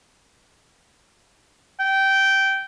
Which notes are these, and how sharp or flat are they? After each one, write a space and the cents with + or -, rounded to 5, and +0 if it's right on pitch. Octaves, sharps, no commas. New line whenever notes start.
G5 -15